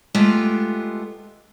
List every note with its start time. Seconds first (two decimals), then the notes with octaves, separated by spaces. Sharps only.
0.15 G#3 A3 B3 F4 G4